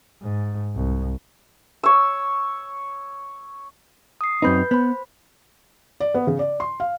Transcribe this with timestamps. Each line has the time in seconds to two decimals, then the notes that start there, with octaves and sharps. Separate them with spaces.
0.22 G#2
0.76 C2
1.83 C#5 E6
4.21 D#6 C7
4.42 F#2 C4 D#4 B4 B5 G6
4.71 B3 C5 B5
6.00 D5
6.14 B3
6.27 C#3
6.39 D5
6.60 C6
6.80 F5